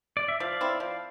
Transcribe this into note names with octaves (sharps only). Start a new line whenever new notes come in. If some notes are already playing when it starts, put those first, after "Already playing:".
D5
E5
F3 D5 F5
C4 E4
F3